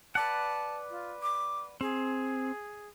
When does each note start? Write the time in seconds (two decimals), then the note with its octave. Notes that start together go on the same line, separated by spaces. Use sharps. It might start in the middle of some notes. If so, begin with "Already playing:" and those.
0.15 B4 D5 F#5 A5
0.90 F4
1.22 D6
1.81 C4 G#4